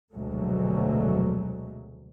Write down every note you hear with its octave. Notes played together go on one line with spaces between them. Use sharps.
F1 D2 B2 F#3 G#3 A3